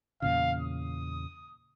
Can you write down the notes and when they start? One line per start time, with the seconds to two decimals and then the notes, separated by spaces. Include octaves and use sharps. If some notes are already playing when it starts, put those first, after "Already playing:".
0.22 E2 A#2 C#3 F5
0.60 D#6